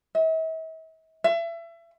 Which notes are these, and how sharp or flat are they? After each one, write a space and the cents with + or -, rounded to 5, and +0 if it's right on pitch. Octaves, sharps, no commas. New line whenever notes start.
E5 -45
E5 +30